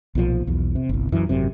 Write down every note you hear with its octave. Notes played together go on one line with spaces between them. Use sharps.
B1 A#2 D3 F3
B1 E2
C3
G1 C2
F#2 E3
G#1 F#2 C3